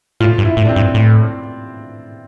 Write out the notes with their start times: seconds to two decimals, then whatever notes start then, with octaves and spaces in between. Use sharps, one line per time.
0.20 A2 F4
0.38 G2
0.45 E4
0.57 A2
0.65 D4
0.69 C4
0.76 G2
0.94 A2